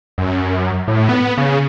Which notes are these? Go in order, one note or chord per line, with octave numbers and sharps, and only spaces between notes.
F#2
A2
B3
C#3